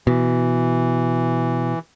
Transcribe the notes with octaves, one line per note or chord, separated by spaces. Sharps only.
B2 E3